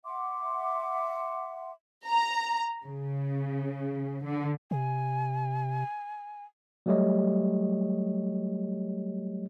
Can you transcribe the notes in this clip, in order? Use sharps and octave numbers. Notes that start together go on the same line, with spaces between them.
E5 F#5 C6 D6
A#5
C#3
D3
C3 G#5
F#3 G3 A3 G4 C#5 D#5